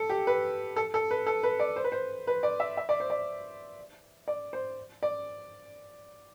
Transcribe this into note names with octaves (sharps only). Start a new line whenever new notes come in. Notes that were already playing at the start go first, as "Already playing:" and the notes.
Already playing: A4
G4
B4
A4
A4
B4
A4
B4
D5
C5
B4
C5
B4
D5
E5
E5
D5
C5
D5
D5
C5
D5